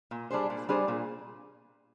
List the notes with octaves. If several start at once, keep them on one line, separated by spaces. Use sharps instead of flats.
A#2
G3 D4 G#4 C5
A#2
G3 D4 G#4 C5
A#2